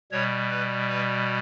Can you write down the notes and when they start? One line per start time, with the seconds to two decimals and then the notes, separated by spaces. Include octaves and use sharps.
0.12 B2 G3 C#5
0.50 B4
0.89 B4